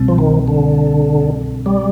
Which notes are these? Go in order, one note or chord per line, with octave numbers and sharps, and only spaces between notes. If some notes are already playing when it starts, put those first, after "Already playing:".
Already playing: C2 B2 G3 C4
F3
D#3
D3
G3